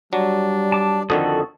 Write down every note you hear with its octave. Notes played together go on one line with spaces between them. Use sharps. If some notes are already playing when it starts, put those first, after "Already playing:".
F#3 G3 D4
A5 D6
F2 D3 D#3 F#4 A4 D#6